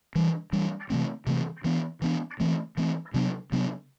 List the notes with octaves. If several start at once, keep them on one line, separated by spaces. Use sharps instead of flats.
E3 G3 D4
E3 G3 D4
C3 E3 A3 C4
C3 E3 A3 C4
E3 B3 D4
E3 B3 D4
E3 A3 C4
E3 A3 C4
C3 F#3 B3 D4
C3 F#3 B3 D4